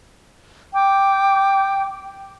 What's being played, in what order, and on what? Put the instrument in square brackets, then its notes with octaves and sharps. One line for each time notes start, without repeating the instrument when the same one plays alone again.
[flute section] G5 D6